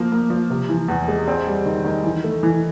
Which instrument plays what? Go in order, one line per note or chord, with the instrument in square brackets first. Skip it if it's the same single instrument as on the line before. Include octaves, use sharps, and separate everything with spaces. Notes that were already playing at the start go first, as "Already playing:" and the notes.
Already playing: [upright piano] F3 A#3
A#3
F3
C3
E3
E2
G#3
C4
G3
D#3
D#3
E3
A3
E3